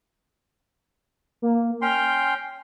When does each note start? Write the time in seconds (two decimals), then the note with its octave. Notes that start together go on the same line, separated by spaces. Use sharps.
1.42 A#3
1.82 C#4 G5 C6 F6